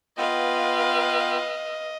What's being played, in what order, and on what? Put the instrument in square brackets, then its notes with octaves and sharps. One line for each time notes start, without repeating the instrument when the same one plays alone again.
[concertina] B3 F4 G5 [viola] B4 F5 [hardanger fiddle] D#5